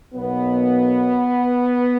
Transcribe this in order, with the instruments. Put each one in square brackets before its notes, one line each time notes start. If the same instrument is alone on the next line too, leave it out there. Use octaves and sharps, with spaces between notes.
[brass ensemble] B1 B2 F#3 A#3 B3